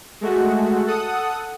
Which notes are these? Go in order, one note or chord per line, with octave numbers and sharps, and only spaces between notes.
G#3 A3 F#4
A4 F#5 D#6